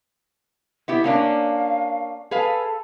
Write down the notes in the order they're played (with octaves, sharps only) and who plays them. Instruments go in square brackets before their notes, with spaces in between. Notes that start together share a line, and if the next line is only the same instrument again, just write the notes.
[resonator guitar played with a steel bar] B3 E4 G4
[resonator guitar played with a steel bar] A#3 C#4 D4 [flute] F5
[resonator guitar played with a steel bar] G#4 B4 F5 [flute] A4